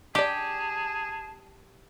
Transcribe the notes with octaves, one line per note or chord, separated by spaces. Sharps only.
D4 G4 G#4 D5 A5